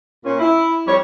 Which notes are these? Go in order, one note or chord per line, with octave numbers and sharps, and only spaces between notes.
A#2 C#4
E4
F2 G3 C#5